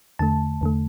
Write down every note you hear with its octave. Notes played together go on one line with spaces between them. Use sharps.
E2 D3 A3 A5
E2 D3 A3